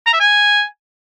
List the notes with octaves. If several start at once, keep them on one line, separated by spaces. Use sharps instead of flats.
A#5
E5
G#5